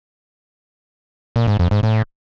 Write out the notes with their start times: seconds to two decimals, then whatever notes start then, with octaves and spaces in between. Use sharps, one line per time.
1.36 A#2
1.48 G#2
1.59 F2
1.71 G#2
1.83 A2